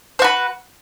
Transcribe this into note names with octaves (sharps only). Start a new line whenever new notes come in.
F#4 B4 C5